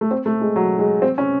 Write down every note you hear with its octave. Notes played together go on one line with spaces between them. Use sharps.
A3
C4
A3
G#3
F#3
G#3
C4
C#4